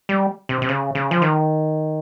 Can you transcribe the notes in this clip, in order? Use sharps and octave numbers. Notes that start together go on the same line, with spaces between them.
G3
C3
C3
C#3
C#3
F3
D#3